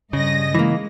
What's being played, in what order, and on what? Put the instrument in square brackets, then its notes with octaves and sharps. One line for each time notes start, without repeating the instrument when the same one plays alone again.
[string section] G2 D#5 A#6 [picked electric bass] C#3
[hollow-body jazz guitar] E3 A#3 [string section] G#3